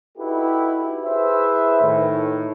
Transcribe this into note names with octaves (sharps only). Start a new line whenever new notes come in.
D#4 E4 F#4 G4 A4 B4
E4 G#4 B4 C5 E5
A2 D#3